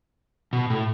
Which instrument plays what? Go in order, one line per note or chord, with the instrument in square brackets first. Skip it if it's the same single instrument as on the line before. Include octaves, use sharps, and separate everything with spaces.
[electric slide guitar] B2
A2